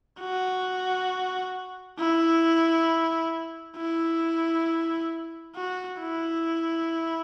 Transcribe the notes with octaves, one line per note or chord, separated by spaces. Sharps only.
F#4
E4
E4
F#4
E4